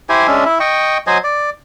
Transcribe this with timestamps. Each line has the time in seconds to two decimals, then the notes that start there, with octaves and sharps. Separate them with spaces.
0.09 E4 G4 C5 G#5
0.27 G#3 C#4 D4 E5
0.46 E4 E5
0.60 D#5 G5 C#6
1.07 F#3 C5 D#5 G#5
1.24 D5